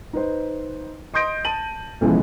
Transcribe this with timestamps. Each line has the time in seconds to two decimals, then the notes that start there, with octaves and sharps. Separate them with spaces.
0.13 D#4 B4 C5
1.14 D#5 C6 D#6 G6 A#6 D7
1.45 A5 D#7 F#7
2.01 B1 C#3 E3 F3 G#3